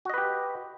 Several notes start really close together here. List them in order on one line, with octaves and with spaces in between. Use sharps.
F#4 D#5 B4 G4